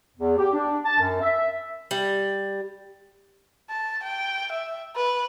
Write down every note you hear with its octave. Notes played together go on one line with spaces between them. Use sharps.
E2
G4
D4
A5
F#2
E5
G3
A5
G5
E5
B4